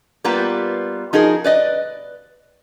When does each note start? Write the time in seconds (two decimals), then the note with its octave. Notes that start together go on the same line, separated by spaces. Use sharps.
0.24 G3 A#3 B3 F4 G4 B4
1.13 F3 D#4 F#4 G#4 A#4
1.44 B4 D5 D#5